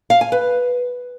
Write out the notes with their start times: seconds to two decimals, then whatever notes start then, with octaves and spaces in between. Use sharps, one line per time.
0.10 F5
0.21 G#5
0.32 B4